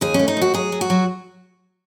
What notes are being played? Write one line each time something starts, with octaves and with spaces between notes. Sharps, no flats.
D#2 G#4
C#4
A3
D#4
D#2 F#4
F#3 G#4
F#3
F#4
F#3